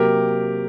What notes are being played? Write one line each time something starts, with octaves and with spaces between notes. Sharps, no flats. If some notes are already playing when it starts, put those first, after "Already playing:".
Already playing: C3 F#3 A#3 G4 A#4